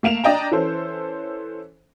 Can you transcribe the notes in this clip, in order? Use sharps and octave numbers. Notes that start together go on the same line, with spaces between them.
A3 A#3 E7 F7
D4 D5 D#5 G5 A#5
E3 C#4 A4 C5